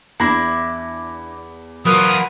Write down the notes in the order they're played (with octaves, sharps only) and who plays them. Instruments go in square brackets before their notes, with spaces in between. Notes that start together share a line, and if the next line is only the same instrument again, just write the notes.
[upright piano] E2 B5 A#6 [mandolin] D4 E4 D5
[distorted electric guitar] F#3 F4 [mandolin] D#4 A#4 F#5 [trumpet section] B4 D#6